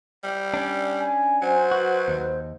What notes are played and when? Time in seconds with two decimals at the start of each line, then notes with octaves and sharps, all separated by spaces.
0.23 G3
0.54 C#4 D4
1.00 G#5
1.42 F#3 C5 G#5
1.72 F#4 B4
2.08 D#2